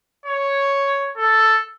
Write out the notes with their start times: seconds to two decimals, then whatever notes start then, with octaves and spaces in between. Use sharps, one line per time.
0.26 C#5
1.17 A4